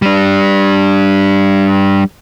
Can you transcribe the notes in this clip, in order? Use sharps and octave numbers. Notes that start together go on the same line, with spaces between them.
G3 D4